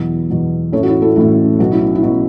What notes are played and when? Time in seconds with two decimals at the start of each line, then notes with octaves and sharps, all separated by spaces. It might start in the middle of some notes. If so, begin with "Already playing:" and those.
Already playing: E2 B2 F#3 E4
0.30 E2 B2 F#3
0.72 A1 A2 A3 C#4 A4 C#5
0.83 F#4
0.88 E4
1.02 E4 A4
1.16 A1 A2 A3 C#4 F#4
1.59 B1 B2 F#3 C#4 F#4
1.72 E4
1.95 E4
2.03 B2 F#3 C#4